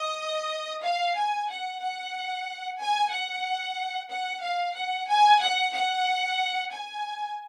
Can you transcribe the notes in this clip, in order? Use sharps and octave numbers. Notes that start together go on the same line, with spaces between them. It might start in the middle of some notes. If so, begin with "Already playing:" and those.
Already playing: D#5
F5
G#5
F#5
F#5
G#5
F#5
F#5
F5
F#5
G#5
F#5
F#5
G#5